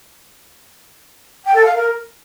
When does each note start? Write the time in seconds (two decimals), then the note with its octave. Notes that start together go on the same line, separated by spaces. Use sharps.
1.45 G5
1.55 A4
1.64 F5
1.74 A#4